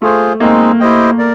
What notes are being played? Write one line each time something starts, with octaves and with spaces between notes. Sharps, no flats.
A3 F4 G#4 C5
G#3 A#3 C4 D#4
E4 G4 C5 D#5 G5
A#4 D5